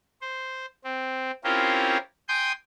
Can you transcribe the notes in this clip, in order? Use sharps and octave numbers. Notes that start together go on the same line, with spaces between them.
C5
C4
C4 C#4 E4 F4 G4 A#4
G5 G#5 C6 D#6 G6